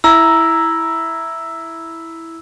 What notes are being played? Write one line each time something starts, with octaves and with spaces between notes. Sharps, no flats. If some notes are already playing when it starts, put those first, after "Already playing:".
E4 A#5 E6